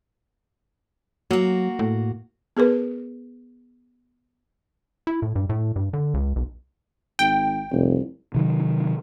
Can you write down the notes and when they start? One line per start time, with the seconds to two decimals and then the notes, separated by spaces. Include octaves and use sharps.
1.31 F#3 A#3 F#4
1.79 A2
2.57 B3 G#4 A#4 B4
5.07 E4
5.22 A2
5.36 G2
5.50 A2
5.76 G2
5.93 D3
6.14 C#2
6.36 B1
7.19 G#1 G5
7.72 F1 C2
8.34 C3 D#3 F#3